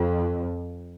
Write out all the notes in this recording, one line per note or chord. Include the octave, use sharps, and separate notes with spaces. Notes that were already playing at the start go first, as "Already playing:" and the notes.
Already playing: F2